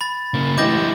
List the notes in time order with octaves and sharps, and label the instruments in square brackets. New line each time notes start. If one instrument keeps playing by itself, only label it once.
[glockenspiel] B5 A6
[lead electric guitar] C#3 A#3
[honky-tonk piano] A1 E3 D#5 [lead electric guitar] E4 G4 [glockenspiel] D6 G6 A#6